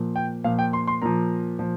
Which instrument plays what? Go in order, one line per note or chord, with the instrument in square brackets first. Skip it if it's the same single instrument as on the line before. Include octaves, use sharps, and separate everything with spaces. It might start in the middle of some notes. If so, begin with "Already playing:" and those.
Already playing: [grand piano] A#2 F3
G5
A#2 F3 F5
G5
C6
C6
A#2 F3 A#5
A#2 F3